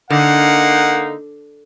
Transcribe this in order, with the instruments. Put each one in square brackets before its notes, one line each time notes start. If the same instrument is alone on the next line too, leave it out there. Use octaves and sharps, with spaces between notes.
[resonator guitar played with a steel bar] D3 [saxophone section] A#3 D#4 [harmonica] F#5